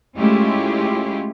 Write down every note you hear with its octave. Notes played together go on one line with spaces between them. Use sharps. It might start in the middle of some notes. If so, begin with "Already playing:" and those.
G#3 A3 C#4 E4 F4 G4